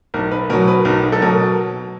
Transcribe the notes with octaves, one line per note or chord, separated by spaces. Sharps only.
B1 A#4
B4
B2 F#3 A#4
B4
B1 A#4
A4
B2 F#3 A#4